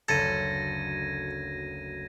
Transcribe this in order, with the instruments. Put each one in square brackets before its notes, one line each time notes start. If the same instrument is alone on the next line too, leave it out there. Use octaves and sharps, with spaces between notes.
[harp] F#1 D2 [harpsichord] A4 [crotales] G#6 A#6 D#7